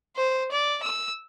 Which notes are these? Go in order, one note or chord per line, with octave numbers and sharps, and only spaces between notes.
C5
D5
E6